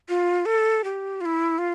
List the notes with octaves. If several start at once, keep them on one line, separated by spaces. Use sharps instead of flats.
F4
A4
G4
F4
E4
F4